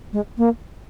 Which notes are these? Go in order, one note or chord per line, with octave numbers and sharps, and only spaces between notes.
G#3
A#3